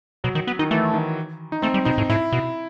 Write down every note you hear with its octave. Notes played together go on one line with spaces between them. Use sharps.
B2 F#3
D#3
B3
D#3 D#4
E3 A3
D#3
D#4
A3 C4
G3
B2 D#4
A2
A2 E4
B2